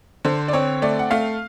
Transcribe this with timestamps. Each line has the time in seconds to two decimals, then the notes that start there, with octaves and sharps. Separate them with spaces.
0.25 D3 C5
0.48 D5
0.53 C4 C#5
0.82 A3 D5
0.99 F#5
1.11 A3 F5